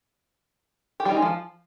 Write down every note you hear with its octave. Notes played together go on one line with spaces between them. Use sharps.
G4
G3
D#4
G#3
F3